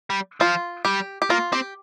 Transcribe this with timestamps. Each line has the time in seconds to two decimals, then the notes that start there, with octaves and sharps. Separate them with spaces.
0.10 G3
0.40 F3 F4
0.85 G3 G4
1.22 G4
1.30 A#3 F4
1.52 C4 G4